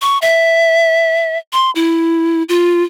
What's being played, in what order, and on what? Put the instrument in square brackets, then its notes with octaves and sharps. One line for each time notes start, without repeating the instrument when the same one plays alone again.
[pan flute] C#6
E5
C6
E4
F4